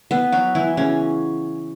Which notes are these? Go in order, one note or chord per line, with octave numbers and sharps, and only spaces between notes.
B3 B4
F#3 F#4
E3 E4
C#3 C#4